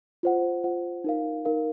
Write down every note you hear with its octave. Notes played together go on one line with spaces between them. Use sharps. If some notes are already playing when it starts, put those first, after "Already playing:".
F4 C5 F#5
F4 C5 F#5
D#4 A#4 F5
D#4 A#4 F5